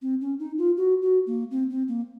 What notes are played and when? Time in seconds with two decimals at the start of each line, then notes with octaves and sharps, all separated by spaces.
0.02 C4
0.21 C#4
0.39 D#4
0.58 F4
0.77 F#4
1.02 F#4
1.27 A#3
1.51 C4
1.70 C4
1.88 A#3